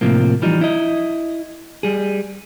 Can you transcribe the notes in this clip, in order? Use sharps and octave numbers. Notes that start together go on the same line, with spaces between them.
A2 C3 F3 A#3
E3 F3 G3 D#4
E4 D#5
G3 G#4